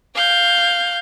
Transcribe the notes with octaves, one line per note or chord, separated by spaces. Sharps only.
F5 G6